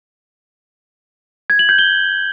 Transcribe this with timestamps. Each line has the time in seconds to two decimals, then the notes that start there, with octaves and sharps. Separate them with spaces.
1.50 G#6
1.59 F#7
1.69 G6
1.79 G7